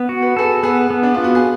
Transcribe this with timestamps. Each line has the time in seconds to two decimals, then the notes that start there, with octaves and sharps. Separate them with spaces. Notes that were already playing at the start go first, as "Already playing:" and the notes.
Already playing: B3
0.09 F#4
0.22 B4
0.37 G#4 A4 B4
0.63 B3 G#4 B4
0.90 B3
1.03 D4
1.14 B3 F4
1.24 F#4
1.35 G#4